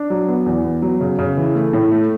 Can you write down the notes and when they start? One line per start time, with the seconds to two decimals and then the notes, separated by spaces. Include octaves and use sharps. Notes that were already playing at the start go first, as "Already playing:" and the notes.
Already playing: D4
0.10 F#3
0.29 B3
0.46 E2
0.65 B3
0.82 F#3
1.01 C#3
1.19 C#3
1.37 E3
1.55 A3
1.73 A2
1.91 A3